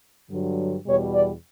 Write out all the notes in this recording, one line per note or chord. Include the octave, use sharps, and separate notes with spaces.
G2 D3 F#3
E2 B2 G3 C#5
D5